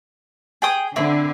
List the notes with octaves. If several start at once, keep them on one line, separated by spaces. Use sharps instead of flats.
G#4 G5 D#6
D3 C4 E4